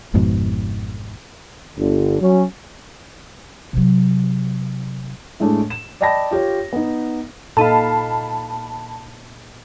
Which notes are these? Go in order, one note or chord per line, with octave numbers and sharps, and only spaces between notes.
G#1 F2 G#2 B2
G1 D3
F#3 C#4
C3 F#3
A2 G#3 A3 D4
E7
D5 D#5 G5 A5 B5 A#6
F4 G4 C#5
B3 D#4
A#2 D#4 A4 F5 A5 B5 D#7